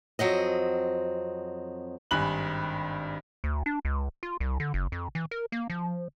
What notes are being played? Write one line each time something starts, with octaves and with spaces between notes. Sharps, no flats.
F2 F#3 C4 D#5
G#1 G2 G#5 B5 F#6 F#7
D2
D4
C#2
F4
C2
D3
F#1
F2
E3
A#4
A#3
F3